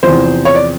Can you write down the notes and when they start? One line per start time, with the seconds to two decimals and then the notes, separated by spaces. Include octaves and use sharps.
0.03 E2 C3 F3 C5
0.45 C#5
0.55 D5